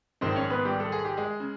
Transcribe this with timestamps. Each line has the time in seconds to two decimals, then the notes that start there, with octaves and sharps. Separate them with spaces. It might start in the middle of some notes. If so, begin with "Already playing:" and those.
0.21 A#1 G#2 D#3 C4 C5
0.36 C#4 C#5
0.50 B3 B4
0.65 G3 G4
0.80 A4
0.92 G#4
1.05 G4
1.17 G#3 G#4
1.40 C#3